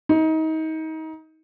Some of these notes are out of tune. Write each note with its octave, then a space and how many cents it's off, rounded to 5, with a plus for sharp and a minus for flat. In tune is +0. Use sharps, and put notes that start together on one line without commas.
D#4 +30